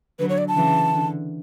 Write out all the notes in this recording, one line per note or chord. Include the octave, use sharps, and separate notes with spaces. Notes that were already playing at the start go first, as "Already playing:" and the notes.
D3 F#3 B4
C#5
D5
A5
C#3 E3
D3